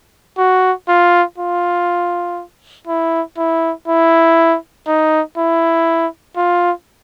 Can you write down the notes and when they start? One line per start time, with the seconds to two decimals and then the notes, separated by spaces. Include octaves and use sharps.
0.38 F#4
0.88 F4
1.38 F4
2.87 E4
3.38 E4
3.87 E4
4.87 D#4
5.37 E4
6.37 F4